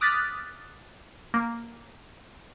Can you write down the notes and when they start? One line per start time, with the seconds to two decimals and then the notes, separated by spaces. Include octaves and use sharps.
0.01 D6 D#6 F6 F#6 A6 B6
1.34 A#3